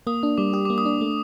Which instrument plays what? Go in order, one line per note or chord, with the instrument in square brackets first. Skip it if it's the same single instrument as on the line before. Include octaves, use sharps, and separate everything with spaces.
[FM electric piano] A#3 [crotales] D#6
[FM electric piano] D4 [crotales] D#6
[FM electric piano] G3 [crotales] D6
[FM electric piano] G4 [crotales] D#6
[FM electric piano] A#3 [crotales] D6
[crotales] D#6
[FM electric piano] D4
A3